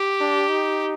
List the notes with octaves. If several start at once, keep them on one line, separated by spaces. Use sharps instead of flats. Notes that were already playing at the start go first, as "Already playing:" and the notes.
Already playing: G4
D4
D#4